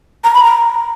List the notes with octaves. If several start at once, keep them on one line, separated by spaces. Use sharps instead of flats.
A#5
B5
A#5